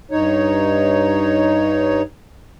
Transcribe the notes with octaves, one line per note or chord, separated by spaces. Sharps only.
G2 D#4 C#5